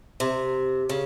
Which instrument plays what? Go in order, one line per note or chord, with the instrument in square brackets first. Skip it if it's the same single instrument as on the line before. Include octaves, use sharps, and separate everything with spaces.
[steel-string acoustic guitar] C3
C#3